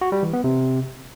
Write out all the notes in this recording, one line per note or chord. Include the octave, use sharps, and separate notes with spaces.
F#4
G3
E3
B3
C3